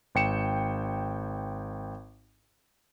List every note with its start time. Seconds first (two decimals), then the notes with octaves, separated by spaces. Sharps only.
0.15 G#1 G5 C#7 E7